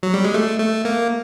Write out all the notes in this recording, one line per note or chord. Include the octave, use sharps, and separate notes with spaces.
F#3
G3
G#3
A3
A3
A#3